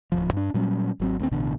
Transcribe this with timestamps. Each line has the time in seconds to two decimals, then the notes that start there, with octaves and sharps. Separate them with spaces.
0.12 D1 F#2 F3
0.33 G2 D4
0.54 A#2 F#3 G3 C#4
1.00 G#1 F#3 C4
1.19 D2 A3 C4
1.31 A1 B2 D3